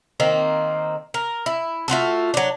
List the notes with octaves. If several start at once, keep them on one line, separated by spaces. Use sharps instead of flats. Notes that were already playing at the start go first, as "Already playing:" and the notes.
D#3 A#3 C4
A#4
E4
A3 F4 F#4 A4
F#3 D4